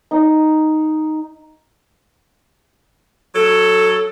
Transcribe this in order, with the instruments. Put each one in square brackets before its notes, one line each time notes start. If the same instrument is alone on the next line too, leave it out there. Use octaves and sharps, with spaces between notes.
[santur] D#4
[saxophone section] F#3 A4